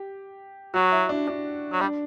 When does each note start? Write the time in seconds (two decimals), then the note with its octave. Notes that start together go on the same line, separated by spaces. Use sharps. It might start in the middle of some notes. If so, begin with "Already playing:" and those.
Already playing: G4
0.74 F#3 F#4
0.92 E4
1.09 D4
1.27 D4
1.72 F#3
1.81 G3 D4